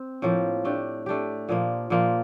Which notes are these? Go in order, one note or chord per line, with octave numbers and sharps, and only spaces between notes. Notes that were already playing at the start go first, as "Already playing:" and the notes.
Already playing: C4
A2 F3 A#3
A3 D4 G4
A3 D4 G4
A#2 F3 A#3
A#2 F3 A#3